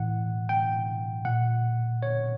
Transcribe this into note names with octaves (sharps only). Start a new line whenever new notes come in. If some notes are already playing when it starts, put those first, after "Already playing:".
Already playing: A2 E3 F#5
G5
A#2 F#5
C#5